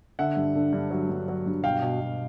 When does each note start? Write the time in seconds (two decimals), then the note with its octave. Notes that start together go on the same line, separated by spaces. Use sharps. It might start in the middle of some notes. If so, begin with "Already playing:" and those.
0.19 D3 E5 F#5
0.37 G2
0.55 D3
0.73 G2
0.91 F#3
1.09 G2
1.28 F#3
1.46 G2
1.64 B2 F5 G5
1.82 B2
2.00 B2